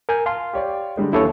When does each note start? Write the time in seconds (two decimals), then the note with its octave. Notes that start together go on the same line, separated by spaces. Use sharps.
0.09 A#4 G#5 G6
0.26 F5 A5 C6
0.53 G4 C#5 D5
0.97 D3 G3 G#3
1.13 D#2 D3 E3 E4 A4 C#5